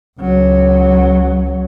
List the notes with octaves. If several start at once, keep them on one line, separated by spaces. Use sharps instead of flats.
C#2 F#3